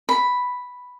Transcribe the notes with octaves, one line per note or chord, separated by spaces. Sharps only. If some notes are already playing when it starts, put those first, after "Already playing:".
B5